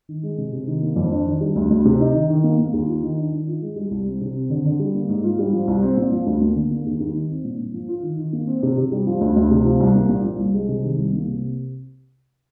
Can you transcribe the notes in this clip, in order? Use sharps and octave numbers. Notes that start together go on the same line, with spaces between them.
D#3
G#3
C3
C3
D#3
A#3
F2
D4
D#3
G3
D2
D2
C3
D#4
D#3
D#3
A#3
A#3
D#2
F4
D#3
D4
D#3
F4
G#3
G3
C2
C4
C3
C4
D3
D3
G3
A#3
G#2
F4
G3
F3
C2
C4
A#2
F3
D2
A#3
D3
A#3
D#2
D#2
D#3
C4
A#2
A#2
F3
F4
D#3
D#3
A#3
C4
C3
C3
G3
F3
D2
D2
C3
F3
C2
A#3
A#2
F3
C2
G#3
C3
D#3
C2
A#3
C3